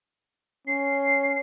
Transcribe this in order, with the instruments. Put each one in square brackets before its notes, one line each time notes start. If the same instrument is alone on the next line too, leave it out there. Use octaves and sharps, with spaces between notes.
[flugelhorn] C#4 [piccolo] C7